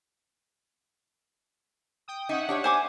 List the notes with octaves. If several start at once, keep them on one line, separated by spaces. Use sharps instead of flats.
G5 D#6
C#4 D#4 E5 F#5
D4 G4 C#5
C5 G#5 D6